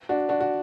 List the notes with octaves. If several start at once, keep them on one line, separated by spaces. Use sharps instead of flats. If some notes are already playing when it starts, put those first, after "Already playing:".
D4 F#4
D4 F#4
F#4